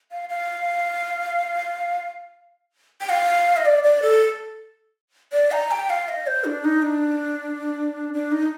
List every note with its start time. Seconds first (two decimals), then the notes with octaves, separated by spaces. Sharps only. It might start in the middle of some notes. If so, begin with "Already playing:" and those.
0.11 F5
0.29 F5
3.01 G5
3.09 F5
3.57 D#5
3.66 D5
3.84 D5
4.02 A4
5.33 D5
5.52 A#5
5.71 G5
5.90 F5
6.08 D#5
6.27 C5
6.45 D4
6.64 D#4
6.82 D4
8.13 D4
8.32 D#4